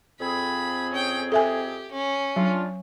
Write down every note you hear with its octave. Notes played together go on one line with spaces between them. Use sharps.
F2 C4 G#4 B5
C#4 G5
G4 A4 E5 G#5
C#4
F#3 D4 F4